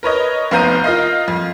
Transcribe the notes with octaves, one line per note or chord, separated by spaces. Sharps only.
A#4 B4 C#5 D#5
F1 B3 F5 A#5 G6 D#7
F4 A#4 D#5 F5
F2